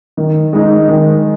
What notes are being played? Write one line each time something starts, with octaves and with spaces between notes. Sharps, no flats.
D#3
G#3 D#4
D#3